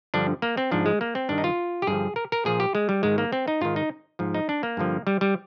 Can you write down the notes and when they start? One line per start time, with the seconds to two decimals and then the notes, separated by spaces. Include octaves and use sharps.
0.14 G2 D3 F3 D4
0.42 A#3
0.57 C4
0.71 G#2 F3 D4
0.86 G#3
1.01 A#3
1.15 C4
1.29 G2 D#3 D4
1.38 D#4
1.44 F4
1.82 G4
1.87 G2 D3 F3 G#4
2.16 A#4
2.32 A#4
2.45 A#2 F3 G#4
2.60 G4
2.75 G#3
2.89 G3
3.03 G#2 D#3 G#3
3.18 A#3
3.32 C4
3.48 D#4
3.61 G#2 D#3 F4
3.76 D#4
4.19 G#2 F3
4.34 D#4
4.49 D4
4.63 A#3
4.77 G2 D3 F3
5.07 G3
5.21 G3